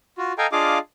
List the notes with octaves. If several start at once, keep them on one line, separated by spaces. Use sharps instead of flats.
F4 F#4
A4 D#5 F5 G5 G#5 A#5
D4 F4 G#4 D#5 F5 D6